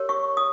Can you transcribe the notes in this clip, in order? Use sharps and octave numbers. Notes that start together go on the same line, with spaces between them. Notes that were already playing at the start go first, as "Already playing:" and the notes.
Already playing: G4 A#4 C#5
C#6
D#6